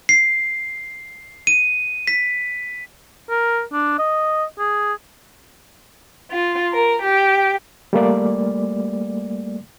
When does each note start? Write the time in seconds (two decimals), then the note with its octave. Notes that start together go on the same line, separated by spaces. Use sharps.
0.09 C7
1.47 D#7
2.07 B6
3.30 A#4
3.73 D4
3.99 D#5
4.59 G#4
6.31 F4
6.71 A#4
7.02 G4
7.93 G3 A3 A#3 D5